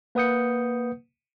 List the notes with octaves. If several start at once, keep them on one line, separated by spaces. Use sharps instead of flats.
A#3 B4 F#5 D#6 G6 C#7